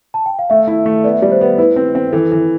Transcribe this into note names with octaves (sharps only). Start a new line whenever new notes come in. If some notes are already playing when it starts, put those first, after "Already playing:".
A5
G5
F5
A3 E5
E4
A3
B3 D5
E5
G3 D5
C5
B3
E4 B4
C4
C4
E3 A4
E3